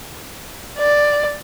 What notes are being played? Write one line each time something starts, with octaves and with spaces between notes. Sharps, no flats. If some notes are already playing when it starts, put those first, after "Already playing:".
D5